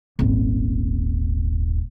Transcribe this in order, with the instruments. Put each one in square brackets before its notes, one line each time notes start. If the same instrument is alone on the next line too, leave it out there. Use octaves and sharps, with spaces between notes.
[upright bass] D#1 G#1